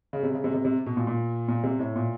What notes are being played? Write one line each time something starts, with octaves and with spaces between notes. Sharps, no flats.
C#3
C3
C#3
C3
C3
C3
B2
A#2
A#2
A#2
C3
A2
A#2